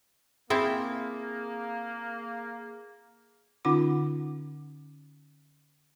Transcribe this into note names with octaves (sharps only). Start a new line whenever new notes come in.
A#3 C4 E4 G#4
D3 C#4 D#4 F4 F#5 D6